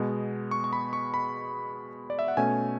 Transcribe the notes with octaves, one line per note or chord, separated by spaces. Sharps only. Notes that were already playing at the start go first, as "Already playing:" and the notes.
Already playing: B2 G#3 B3
C#6
C#6
B5
C#6
B5
D5
E5
F#5
B2 A3 C#4 G#5